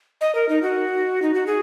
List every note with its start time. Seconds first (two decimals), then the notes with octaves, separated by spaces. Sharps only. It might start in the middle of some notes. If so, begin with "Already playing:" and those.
0.21 D#5
0.35 A#4
0.49 D#4
0.63 F#4
1.22 D#4
1.34 F#4
1.47 G#4